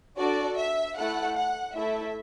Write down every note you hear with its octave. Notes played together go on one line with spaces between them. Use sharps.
D4 F#4 A4 D5
E5
A3 E4 A4 F#5
F#5
A3 E4 A4 E5